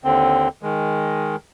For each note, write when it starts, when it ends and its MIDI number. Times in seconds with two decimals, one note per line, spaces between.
0.04 0.48 39
0.04 0.48 50
0.04 0.48 60
0.63 1.36 51
0.63 1.36 56